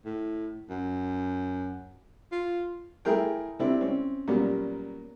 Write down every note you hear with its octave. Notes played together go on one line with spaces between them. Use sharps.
A2
F#2
F4
A3 E4 G#4 A#4 G5
C3 G3 C4 D4 E4
C4 C#4
A#2 F#3 G3 A#3 B3 C#4